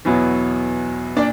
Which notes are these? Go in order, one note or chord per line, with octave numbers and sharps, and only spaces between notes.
E2 B2 F#3 B3 E4
A#2 D4 D5